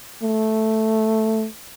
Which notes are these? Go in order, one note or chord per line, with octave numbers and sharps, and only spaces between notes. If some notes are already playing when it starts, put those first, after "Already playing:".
A3